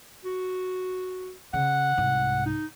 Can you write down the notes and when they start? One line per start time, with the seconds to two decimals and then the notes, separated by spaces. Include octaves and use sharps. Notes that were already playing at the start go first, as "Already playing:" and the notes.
0.25 F#4
1.53 C#3 F#5
1.98 C2 G#2
2.46 D#4